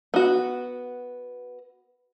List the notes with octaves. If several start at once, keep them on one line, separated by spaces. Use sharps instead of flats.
B3 F#4